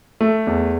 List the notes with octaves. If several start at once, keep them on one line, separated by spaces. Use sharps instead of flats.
A3
E2